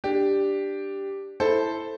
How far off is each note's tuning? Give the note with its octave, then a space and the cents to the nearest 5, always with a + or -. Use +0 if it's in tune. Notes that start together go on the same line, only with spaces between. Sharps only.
D4 +0 G4 +0
E4 +0 A4 +0 C5 +0